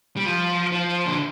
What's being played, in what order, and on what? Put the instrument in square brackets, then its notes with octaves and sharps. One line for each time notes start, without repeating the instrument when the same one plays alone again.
[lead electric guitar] G3
F3
F3
D3